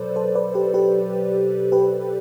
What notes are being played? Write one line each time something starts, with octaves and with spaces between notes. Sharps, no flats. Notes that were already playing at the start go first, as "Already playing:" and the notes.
Already playing: B2 F#3 A4 B4 C5 D5
A4 C5
B4 D5
G4 B4
G4 B4
G4 B4